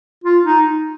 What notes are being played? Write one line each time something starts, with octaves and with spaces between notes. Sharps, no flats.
F4
D#4